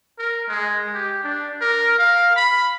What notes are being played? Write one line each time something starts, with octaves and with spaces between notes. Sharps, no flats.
A#4
G#3
G4
D4
A#4
F5
B5